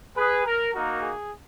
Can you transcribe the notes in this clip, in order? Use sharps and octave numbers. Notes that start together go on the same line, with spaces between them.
G#4 B4
A#4
A#3 D#4 F#4 A#4
G#4